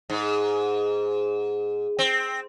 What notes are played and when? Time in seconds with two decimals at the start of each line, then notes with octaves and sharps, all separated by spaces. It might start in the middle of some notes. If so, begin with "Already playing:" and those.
0.10 G#2
1.99 C4